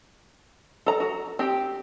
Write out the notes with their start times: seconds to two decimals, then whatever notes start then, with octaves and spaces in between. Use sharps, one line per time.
0.86 A4 A#5
1.00 F#4
1.39 C4 G4